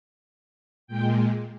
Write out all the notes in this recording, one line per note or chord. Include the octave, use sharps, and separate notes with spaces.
A#2 G#3 G5